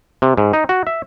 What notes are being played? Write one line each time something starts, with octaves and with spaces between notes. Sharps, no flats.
C3
G#2
D#4
F#4
E5